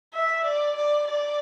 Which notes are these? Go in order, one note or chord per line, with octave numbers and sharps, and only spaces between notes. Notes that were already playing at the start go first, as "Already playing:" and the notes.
E5
D5
D5
D5